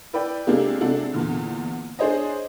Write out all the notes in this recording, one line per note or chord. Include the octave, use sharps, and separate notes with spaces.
E4 B4 D5 G5
C3 G#3 A#3 D4 G4 A4
C3 G#3 D4 F#4 A4
E2 A#2 D3
D4 G#4 C5 C#5 D#5